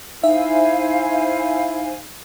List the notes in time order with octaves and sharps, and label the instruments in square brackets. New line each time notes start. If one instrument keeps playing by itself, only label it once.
[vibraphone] D#4 [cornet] E4 [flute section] C5 F5 G#5 [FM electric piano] E5